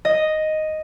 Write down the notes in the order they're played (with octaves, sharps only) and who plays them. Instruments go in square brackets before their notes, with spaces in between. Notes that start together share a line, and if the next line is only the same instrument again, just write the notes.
[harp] D#5